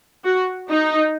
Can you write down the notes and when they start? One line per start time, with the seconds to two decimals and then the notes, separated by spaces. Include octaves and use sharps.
0.24 F#4
0.69 D#4